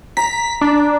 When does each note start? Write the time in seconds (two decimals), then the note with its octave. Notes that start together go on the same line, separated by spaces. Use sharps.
0.17 A#5 B6
0.61 D4